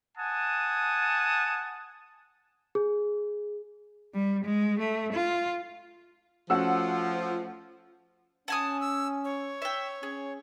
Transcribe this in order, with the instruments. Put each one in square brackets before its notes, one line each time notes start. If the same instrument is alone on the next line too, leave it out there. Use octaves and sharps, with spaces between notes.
[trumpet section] F#5 G#5 A5 D#6
[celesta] G#4
[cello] G3
G#3
A3
F4
[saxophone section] F3 [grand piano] A3 C#4 F#4 [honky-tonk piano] F#5 E6
[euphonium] C#4 [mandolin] F#5 G#5 D#6 [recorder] A5
[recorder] E6
C#5
[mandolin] E5 G5
[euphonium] C#4 [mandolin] G#4